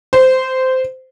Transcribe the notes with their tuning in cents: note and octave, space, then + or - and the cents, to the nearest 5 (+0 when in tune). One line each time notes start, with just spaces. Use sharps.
C5 -15